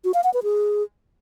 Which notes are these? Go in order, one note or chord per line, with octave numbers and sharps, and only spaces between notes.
F#4
F5
F#5
B4
G#4